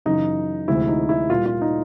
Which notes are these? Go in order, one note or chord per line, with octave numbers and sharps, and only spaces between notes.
F#2 C#3 E3 D#4
D2 C3 F3 G#3 E4
D#4
E4
A#2 G3 F4
F4
D#4